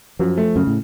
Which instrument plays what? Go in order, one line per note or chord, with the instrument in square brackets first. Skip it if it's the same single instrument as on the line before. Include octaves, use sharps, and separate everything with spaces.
[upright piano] F#2 [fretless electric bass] F3
[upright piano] A3
[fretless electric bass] F#2 [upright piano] C#3
[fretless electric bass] A2